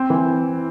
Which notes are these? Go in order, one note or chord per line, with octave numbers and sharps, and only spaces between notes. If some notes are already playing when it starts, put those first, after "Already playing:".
Already playing: C4
E3